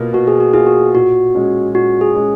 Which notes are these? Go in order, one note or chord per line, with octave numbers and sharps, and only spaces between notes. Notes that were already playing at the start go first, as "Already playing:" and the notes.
Already playing: B2 A#3 F4
B2 F#4
G#4
F#4
A#3 F4 G#4
F#4
A#2 F#4
G#3 C#4
A#2 F#4
G#4
G#3 C#4